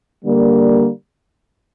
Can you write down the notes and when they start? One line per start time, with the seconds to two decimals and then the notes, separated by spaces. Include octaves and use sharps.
0.24 D3 G3 A#3